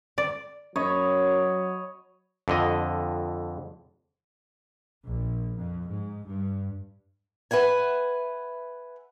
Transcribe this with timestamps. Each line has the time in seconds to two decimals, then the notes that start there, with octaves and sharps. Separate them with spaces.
0.18 D5
0.76 F#2 F#3 C#5 D#5 B5
2.48 F2 D3 D#5
5.06 A#1
5.59 F2
5.89 G#2
6.27 G2
7.51 B4 E5 F#5 G#5